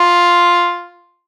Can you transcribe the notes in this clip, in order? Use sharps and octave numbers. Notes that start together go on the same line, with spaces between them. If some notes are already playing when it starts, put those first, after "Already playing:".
Already playing: F4